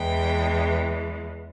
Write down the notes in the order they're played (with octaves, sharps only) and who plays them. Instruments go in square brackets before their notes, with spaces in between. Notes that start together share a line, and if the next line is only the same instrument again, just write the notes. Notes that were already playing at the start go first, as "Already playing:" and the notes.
Already playing: [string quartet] E2 E3 G#3 G5